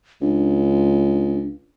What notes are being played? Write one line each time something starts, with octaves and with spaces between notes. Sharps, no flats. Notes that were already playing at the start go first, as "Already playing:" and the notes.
C#2 D4